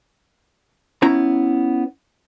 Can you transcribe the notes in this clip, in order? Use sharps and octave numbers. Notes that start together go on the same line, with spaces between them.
B3 C#4 E4 A#5